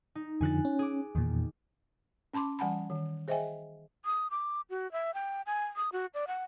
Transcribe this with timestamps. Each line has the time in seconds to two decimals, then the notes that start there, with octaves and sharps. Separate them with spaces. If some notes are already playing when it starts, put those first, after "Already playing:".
0.15 D#4
0.41 F2 D3 F3 G#5 F#6 A6
0.65 C#4
0.79 G#4 D6
1.15 E2 A#2 D#3
2.34 C#4 A5 B5 C6 D6
2.59 E3 G3 F#5 G#5 A5 B5
2.90 D#3
3.28 G#4 C5 D#5 E5 G5 G#5
4.05 D#6
4.31 D6
4.70 F#4
4.92 E5
5.14 G5
5.47 G#5
5.76 D#6
5.92 F#4
6.14 D5
6.27 F#5